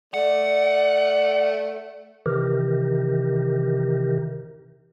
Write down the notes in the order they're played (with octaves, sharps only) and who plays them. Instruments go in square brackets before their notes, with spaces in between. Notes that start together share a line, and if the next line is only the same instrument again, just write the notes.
[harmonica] A3 [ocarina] D5 [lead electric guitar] F#5
[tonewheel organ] C3 D#3 E3 G4 A#4